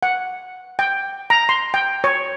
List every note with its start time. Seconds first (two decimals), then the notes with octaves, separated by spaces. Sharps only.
0.03 F#5
0.79 G5
1.30 A#5
1.49 C6
1.74 G5
2.04 C#5